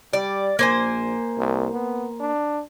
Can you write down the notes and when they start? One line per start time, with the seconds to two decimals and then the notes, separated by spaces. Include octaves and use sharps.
0.13 G3 D5
0.59 A#1 A#3 C5 G#5
1.38 C2
1.72 B3
2.20 D4